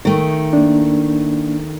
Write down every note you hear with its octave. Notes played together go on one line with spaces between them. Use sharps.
D#3 A3
A#3 D4